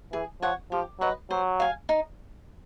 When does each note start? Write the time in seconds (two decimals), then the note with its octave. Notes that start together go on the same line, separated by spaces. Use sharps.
0.13 E3 G#4
0.42 F3 C#5 F#5
0.72 F3 G4
1.00 F#3 B4 D#5
1.31 F#3 C5
1.60 F5 G#5
1.89 D#4